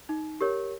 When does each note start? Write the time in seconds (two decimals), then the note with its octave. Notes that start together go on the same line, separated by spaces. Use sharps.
0.09 D#4
0.41 G4 A#4 C#5